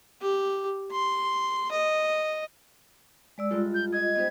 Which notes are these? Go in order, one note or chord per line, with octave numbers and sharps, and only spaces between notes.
G4
C6
D#5
G#3 D5 E6
G2 G#3 F4 A4
G6
D#5 G#6
B3 D#4 G4 C5 D#5